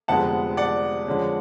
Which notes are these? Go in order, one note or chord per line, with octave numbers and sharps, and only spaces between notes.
F1 F2 D3 G#3 B3 F#5 A5
D5 F#5
F2 D3 G#3 C#4